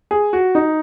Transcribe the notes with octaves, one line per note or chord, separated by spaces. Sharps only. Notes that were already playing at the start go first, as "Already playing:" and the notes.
G#4
F#4
D#4